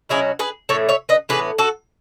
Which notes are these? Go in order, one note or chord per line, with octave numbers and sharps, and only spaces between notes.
B2 F#3 C#4 E4 G#4
G#4 B4
A2 E3 A3 A4 C#5
C#5 E5
B4 D#5
A2 E3 B3 G#4 B4
F#4 A4